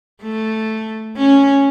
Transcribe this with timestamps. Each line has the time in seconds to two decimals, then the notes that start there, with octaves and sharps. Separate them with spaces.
0.23 A3
1.16 C#4